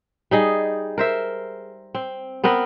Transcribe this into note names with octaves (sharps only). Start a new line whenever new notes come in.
G3 D#4 G#4
A#4 C5 E5
C4
B3 C4 A#4 B4